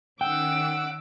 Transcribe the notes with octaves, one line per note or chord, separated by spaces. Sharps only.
D#3 C#4 F#5 G5 D6 E6